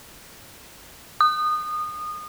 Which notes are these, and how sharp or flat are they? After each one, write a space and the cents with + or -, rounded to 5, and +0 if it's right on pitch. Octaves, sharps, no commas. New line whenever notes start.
D#6 -25